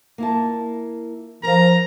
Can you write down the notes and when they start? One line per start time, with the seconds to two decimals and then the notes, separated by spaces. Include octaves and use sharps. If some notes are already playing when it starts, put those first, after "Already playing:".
0.18 A#3 E4 A5
1.43 F3 A#4 F5 A#5